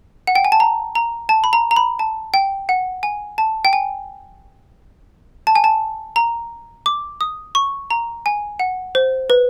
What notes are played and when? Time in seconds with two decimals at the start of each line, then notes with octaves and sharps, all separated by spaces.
0.27 F#5
0.35 G5
0.45 G#5
0.52 A5
0.60 A#5
0.95 A#5
1.29 A5
1.44 B5
1.53 A#5
1.71 A#5
1.76 B5
1.99 A5
2.34 G5
2.69 F#5
3.03 G#5
3.38 A5
3.65 G5
3.73 G#5
5.47 A5
5.55 G#5
5.64 A5
6.16 A#5
6.86 D6
7.21 D#6
7.55 C#6
7.90 A#5
8.26 G#5
8.59 F#5
8.95 C5
9.30 B4